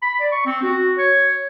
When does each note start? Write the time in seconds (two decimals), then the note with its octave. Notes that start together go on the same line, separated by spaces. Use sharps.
0.02 B5
0.20 D5
0.32 C#6
0.46 C4
0.63 F#4
0.98 C#5